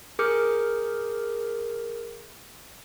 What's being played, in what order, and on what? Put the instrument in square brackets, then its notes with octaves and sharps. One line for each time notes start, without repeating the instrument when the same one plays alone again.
[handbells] G#4 A#4 D6 F6 G6 C#7